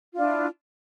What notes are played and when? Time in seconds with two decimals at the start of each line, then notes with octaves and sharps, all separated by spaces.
0.14 F4
0.17 D4
0.20 E4